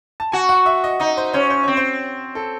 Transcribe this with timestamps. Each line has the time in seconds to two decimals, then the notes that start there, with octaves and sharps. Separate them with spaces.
0.20 A5
0.32 F#4 G#5
0.49 F#5
0.66 E5
0.84 D#5
1.00 D#4 D#5
1.17 C5
1.33 C#4 C5
1.50 C5
1.63 C4 C#5
1.77 C5
2.35 A4